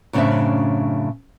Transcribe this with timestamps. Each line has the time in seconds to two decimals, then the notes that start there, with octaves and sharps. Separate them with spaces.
0.13 F#2 A2 C#3 C4 D4 E5